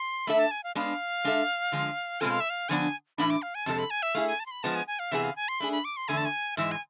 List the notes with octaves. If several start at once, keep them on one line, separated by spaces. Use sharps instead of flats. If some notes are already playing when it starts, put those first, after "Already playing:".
Already playing: C6
A3 D4 A4 E5 B5
A5
G#5
F5
G#3 B3 D4 F5
G#3 D4 A4 E5
D3 F3 G#3
B2 G#3 C4 F4 A4 G#5
F5
E5
F5
D3 F3 B3 D4 G#5
A2 E3 B3 D4 B5
D6
F5
G#5
F2 C3 G#3 D4 A4 A5
B5
G#5
E5
A3 E4 G#4 F5
G#5
A5
C6
B5
F3 G#3 B3 A5
G#5
G#5
F5
C3 E3 B3 D4 G#4 E5
F5
G#5
C6
A3 D4 G#4 B5
B5
D6
C6
E2 D3 A3 G#5
A5
G#5
G#2 E3 G#3 E5
G#5